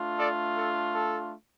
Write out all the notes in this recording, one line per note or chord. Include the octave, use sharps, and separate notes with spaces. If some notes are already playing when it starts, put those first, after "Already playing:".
Already playing: A3 D4 F4
A4 D5
A4
A4